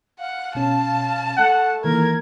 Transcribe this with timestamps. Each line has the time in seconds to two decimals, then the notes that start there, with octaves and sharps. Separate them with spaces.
0.19 F5 F#5
0.55 B2 C#4 A5
1.37 A3 F#5
1.84 D#3 E3 A#3 A#4 G#6